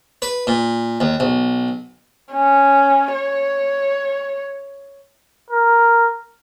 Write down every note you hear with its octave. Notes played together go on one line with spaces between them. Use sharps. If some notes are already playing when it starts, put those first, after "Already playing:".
B4
A#2
D#2
B1
C#4
C#5
A#4